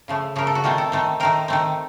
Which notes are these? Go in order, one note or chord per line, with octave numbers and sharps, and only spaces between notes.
C#3 F3 A3
C#3 F3 A3 A#4
A4
F#4
D#3 A3 C4 F4
A4
D#3 A3 C4
D#3 A3 C4 A#4
D#3 A3 C4